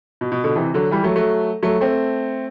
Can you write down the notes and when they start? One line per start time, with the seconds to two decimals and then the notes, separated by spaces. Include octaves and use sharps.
0.21 B2
0.32 B2
0.44 B2 D3
0.55 C3 E3
0.74 D3 F#3
0.91 E3 G3
1.04 F#3 A3
1.16 F#3 A3
1.62 F#3 A3
1.81 A3 C4